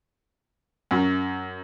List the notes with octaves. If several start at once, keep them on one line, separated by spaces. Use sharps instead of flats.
F#2